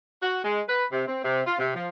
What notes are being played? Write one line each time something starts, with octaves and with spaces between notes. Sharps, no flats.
F#4
G#3
B4
C3
C4
C3
F4
C3
F3